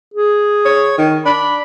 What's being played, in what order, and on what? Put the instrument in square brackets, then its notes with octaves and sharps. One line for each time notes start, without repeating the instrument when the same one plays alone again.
[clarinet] G#4
[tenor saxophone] C#5
D#3
[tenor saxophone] D4 [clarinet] B5